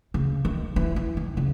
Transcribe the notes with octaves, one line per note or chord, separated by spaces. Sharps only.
C#3
D#3
E3
E3
D#3
C#3